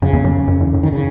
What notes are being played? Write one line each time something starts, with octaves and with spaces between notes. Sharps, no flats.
F#2 C#3
E2
F#2
F#2
E2
F#2
D#3
C#3